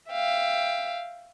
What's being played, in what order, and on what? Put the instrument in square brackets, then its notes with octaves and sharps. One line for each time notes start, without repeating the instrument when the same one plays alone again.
[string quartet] E5 F5 G5